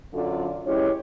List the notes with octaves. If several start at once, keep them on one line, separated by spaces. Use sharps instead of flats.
F#2 D3 F4 A4 D5
E3 G#3 C#4 E4 G4 C#5